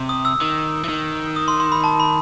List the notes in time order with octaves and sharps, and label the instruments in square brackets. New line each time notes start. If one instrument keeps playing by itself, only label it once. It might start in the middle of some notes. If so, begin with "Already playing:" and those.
Already playing: [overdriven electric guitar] C3
[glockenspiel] D#6
E6
[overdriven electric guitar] D#3
E3
D#3
[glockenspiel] D#6
C6
C6
B5
A5
B5